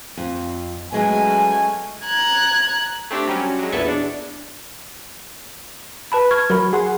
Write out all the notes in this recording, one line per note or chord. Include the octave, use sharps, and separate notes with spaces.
F2
F#3 G#3 A3 B3 C#4 G#5
A#5 F#6 G#6
A3 C4 D4 G4
F#3 G3 C#4
F#3 G#3
A#1 E2 B3 E4 A4 C#6
D4
B4 A5 B5
C#6 F6 G#6
F#3 A#4 B5
G#4 F#5 C6